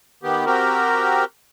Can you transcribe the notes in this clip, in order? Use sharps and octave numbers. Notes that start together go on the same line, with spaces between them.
D#3 B3 G4
C4 F#4 G4 A#4